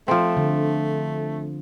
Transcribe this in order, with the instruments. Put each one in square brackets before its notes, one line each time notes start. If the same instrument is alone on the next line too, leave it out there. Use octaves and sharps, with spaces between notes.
[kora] F3 C4 [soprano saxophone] A3
[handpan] D3